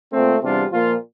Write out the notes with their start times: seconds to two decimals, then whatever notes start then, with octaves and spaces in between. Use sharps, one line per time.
0.13 A#2 A3 C4
0.41 E2 C3 G3 D4 F4
0.72 A#2 F3 A#3 F4